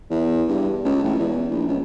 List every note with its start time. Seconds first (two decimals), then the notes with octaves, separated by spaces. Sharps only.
0.10 E2
0.48 G2
0.85 C#2
1.04 A1
1.19 E2
1.51 A#1
1.68 C#2